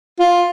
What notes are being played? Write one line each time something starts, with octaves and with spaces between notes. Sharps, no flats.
F4